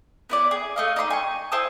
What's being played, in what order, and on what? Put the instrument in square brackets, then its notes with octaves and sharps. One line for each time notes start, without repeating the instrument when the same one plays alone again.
[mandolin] B3 E4 D5
G#4
A3 D#5 F5
D#4 D5 B5 C6
G#5 C#6
E4 C5 A5 D#6